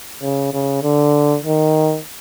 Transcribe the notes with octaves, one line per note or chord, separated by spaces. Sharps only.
C#3
C#3
D3
D#3